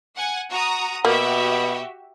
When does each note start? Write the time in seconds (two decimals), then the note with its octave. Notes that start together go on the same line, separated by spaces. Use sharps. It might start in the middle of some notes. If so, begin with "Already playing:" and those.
0.16 F#5 G#5
0.51 F#4 A#5 D#6
1.05 B2 A#3 F#4 G4 E5